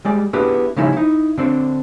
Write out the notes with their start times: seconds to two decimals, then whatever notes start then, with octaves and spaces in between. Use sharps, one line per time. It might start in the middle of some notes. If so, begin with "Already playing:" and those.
0.05 G3 G#3 D5
0.33 B3 D4 E4 G4 G#4 B4
0.76 C#3 F3 G3 C#4 D#4 E4
0.93 D#4 E4
1.37 D3 C4 D4